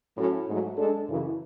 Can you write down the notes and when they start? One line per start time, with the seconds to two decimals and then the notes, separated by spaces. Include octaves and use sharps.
0.17 A2 F#3 C#4 F#4 A4
0.47 G#2 F#3 A3
0.77 G#3 D4 A4
1.08 F#2 C#3 E3